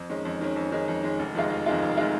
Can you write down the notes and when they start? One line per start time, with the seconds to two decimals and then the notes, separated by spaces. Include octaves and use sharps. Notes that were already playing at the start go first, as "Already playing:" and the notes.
Already playing: F2
0.10 D#3 G#3 C#4
0.25 F2
0.41 D#3 G#3 C#4
0.56 F2
0.72 D#3 G#3 C#4
0.88 F2
1.03 D#3 G#3 C#4
1.19 F1
1.35 F2 D#3 G#3 F4
1.50 F1
1.66 F2 D#3 G#3 F4
1.82 F1
1.97 D#3 G#3 F4